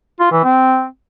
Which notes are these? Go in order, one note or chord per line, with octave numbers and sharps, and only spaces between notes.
F4
E3
C4